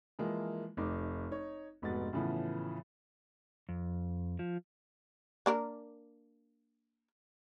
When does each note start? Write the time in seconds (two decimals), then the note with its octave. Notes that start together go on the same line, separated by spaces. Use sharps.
0.19 E3 F3 G#3 A#3 E4
0.77 F1 D#4 D6
1.31 D#4 C#5
1.82 F1 G#2 B2 B3 A6
2.13 A2 C#3 E3 F3 B3
3.69 F2
4.39 F3
5.46 A#3 D4 A#4